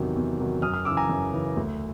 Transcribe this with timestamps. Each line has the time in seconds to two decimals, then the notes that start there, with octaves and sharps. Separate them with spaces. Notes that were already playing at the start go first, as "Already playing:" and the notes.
Already playing: E2 C3 D#3 F#3
0.16 E2
0.38 C3 D#3 F#3
0.62 F#2 D#6 F6
0.73 D#6 F6
0.85 C#3 E3 D6 E6
0.97 G#5 A#5
1.09 F#2
1.33 C#3 E3
1.57 D2